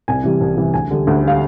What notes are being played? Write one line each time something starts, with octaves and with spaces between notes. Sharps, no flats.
C2 G#5
C3 E3 G3
C2
C3 E3 G3
D2 G#5
D3 G3
D2
D3 G3 F5